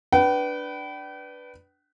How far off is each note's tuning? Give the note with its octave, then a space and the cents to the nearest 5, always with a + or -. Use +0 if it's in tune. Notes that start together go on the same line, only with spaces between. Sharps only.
D4 +0 B4 +0 G5 -40